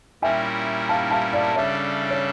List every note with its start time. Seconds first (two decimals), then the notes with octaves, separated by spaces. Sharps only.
0.22 A#2 G3 C#4 E4 A#4 E5 G5
0.89 F5 A5
1.11 F5 A5
1.33 D5 F5
1.55 C#3 G3 D4 A4 C#5 E5
2.10 C#5